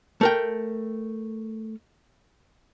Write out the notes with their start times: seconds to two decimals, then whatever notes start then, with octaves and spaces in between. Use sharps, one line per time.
0.21 A3 A#4 G5